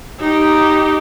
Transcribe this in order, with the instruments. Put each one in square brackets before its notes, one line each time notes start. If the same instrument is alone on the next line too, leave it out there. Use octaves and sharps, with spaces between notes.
[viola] D#4 G4